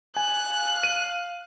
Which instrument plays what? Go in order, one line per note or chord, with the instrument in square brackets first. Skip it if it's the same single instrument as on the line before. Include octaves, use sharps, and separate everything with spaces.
[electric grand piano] G#5 [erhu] F#6
[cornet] F5
[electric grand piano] D#7